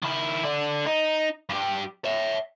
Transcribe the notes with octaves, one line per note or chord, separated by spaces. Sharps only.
D#3 E4
D3 D4
D#4
G2 G4
C#5 E5